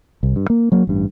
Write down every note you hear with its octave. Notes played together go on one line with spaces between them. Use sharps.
C2
G2
A#3
F#3 A#3
A1 G2